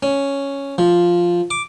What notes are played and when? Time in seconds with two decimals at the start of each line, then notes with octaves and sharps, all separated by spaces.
0.03 C#4
0.78 F3
1.51 D6